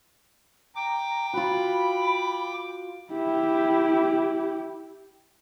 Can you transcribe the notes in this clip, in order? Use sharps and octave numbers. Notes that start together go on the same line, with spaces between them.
G5 A#5 D6
F4 F#4 B5
E4 G4